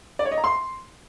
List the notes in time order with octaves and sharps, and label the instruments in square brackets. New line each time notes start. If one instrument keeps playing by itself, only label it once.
[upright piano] D5
C#5
D#5
A#5
C6